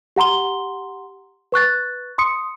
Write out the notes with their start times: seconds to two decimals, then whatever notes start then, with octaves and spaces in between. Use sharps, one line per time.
0.16 G4 F#5 A#5 C6 G7
1.52 B4 C#6 F#6 A6
2.18 C6 D#6 C#7